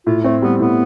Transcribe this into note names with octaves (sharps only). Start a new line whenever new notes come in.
A2 F4
A3 C4
G3 B3
A2 B3